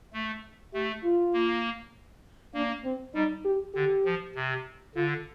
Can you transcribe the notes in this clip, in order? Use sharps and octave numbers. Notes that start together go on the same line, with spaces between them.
A3
A3 G4
F4
A#3
A#3 D4
C4
G3 D#4
G4
D3 G4
F3
C3
D3 F4